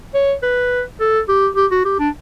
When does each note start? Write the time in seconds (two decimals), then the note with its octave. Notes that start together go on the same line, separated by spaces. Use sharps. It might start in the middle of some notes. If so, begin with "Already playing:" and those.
0.14 C#5
0.43 B4
1.00 A4
1.28 G4
1.56 G4
1.71 F#4
1.85 G4
1.99 D4